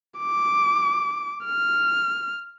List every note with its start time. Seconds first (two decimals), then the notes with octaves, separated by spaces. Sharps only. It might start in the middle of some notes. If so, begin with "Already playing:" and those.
0.18 D6
1.45 F6